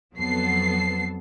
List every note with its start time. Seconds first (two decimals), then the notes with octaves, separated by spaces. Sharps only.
0.16 F2 F#3 B3 A4 C7